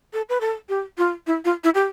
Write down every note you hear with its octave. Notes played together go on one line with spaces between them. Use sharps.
A4
B4
A4
G4
F4
E4
F4
E4
G4